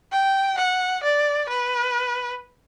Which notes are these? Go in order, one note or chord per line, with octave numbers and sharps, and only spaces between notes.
G5
F#5
D5
B4